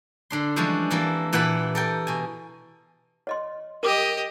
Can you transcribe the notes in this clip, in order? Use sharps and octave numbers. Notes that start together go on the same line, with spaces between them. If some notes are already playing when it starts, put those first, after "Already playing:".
D3 D4 C6
E3 F3 G3 G#3 C#4 D4
E3 A#3 C4 A4
A#2 E3 G4 F#5 A5 B5
A4 A#4 G5
B2 G#5
C#5 D#5 C6
G4 A#4 D#5 D6 D#6